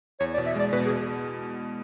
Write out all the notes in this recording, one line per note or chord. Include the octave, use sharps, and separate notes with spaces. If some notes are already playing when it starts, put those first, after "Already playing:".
E2 C#5
D5
B2
E5
G#3 D5
B2 B4
G#4
B2